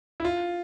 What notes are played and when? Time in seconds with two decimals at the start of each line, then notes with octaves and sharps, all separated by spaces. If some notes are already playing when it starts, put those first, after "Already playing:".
0.20 E4
0.25 F4